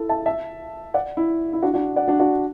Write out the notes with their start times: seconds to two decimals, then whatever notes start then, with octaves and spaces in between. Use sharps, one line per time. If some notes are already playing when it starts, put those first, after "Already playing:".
Already playing: E4 A4
0.09 E5 A5
0.26 E5 A5
0.94 D5 F#5
1.17 E4
1.53 E4
1.62 D4 F#4
1.74 D4 F#4
1.96 D5 F#5
2.08 D4 F#4
2.19 D4 F#4